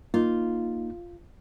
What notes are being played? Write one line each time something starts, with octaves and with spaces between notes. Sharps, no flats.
A#3 D#4 F4